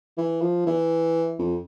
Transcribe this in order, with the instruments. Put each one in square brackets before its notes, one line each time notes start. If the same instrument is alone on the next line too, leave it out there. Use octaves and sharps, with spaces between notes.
[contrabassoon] E3
F3
E3
F2